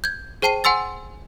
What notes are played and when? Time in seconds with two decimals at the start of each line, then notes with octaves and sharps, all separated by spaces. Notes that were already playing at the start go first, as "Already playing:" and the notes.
0.04 G6 G#6
0.42 G#4 C5 G5 A5 C7 D#7
0.64 F#5 G#5 C6 E6 A6